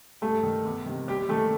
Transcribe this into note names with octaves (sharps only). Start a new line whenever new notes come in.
G2 A3 A4
D#3
E2
C3 D#3
D#2 G3 G4
D#3 A3 A4